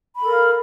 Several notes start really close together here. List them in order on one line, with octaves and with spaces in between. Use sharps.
B5 A4 A#4 F5